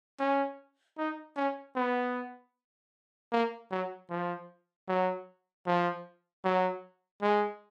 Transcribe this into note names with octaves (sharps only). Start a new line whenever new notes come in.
C#4
D#4
C#4
B3
A#3
F#3
F3
F#3
F3
F#3
G#3